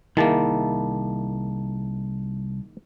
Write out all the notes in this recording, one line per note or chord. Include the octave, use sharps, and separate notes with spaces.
C2 D#3 A#3 E4 G#4 A5